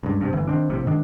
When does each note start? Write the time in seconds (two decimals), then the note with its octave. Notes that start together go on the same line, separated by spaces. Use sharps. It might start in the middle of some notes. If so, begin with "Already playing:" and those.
0.03 C#2 G2
0.21 G2 C3
0.33 G1 E3
0.47 D#3 C4 D4
0.70 A#1 F2 A2 C3
0.86 G#2 D#3 D4